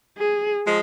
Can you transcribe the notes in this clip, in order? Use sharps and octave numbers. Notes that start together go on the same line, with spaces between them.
G#4
F3 G#3